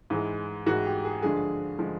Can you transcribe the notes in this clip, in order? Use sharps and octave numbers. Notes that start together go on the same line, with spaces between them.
G#2 E3 G#3
G#2 E3 G#3 F#4
G4
G#4
G2 D3 F3 G#3 G#4
D3 F3 G#3